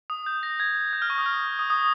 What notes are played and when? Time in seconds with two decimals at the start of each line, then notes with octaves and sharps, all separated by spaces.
0.10 D#6
0.26 G6
0.43 A#6
0.60 G#6
0.93 G6
1.02 F6
1.10 C#6
1.18 D#6
1.26 F6
1.59 D#6
1.70 D#6